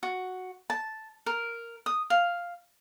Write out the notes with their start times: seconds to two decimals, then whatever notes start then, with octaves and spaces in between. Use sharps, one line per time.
0.03 F#4
0.70 A5
1.26 A#4
1.86 D#6
2.10 F5